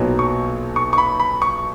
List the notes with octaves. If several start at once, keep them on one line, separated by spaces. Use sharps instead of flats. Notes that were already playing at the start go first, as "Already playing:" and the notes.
Already playing: B1 A#2 F#3 B3
C#6
C#6
C#6
B5
B5
C#6